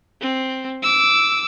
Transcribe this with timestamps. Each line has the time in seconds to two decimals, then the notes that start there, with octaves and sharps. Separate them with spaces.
0.21 C4
0.83 D6 E6